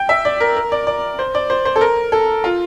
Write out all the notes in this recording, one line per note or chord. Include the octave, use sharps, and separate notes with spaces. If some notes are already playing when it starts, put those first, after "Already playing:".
Already playing: G5
E5
D5
A#4
A#4
D5
D5
C5
D5
C5
C5
A4
A#4
A4
F4